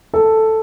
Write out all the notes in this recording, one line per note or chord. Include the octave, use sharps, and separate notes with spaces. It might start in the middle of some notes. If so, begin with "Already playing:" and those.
A4